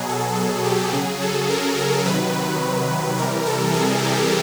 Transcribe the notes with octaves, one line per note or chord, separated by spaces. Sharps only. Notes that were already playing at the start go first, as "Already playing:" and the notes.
Already playing: B2 F#3 G#4
A4
A4
G4
C#3 F#3 G#4
A4
A#4
A#4
C3 D#3 F#3 B4
C3 E3 G3 A#4
A4
G#4
G4